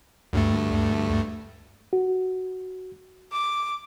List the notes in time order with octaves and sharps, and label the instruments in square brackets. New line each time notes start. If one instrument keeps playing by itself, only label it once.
[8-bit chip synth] D2 G2 A3
[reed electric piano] F#4
[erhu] D6